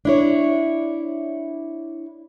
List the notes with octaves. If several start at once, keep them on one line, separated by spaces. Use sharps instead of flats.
D4 E4 C#5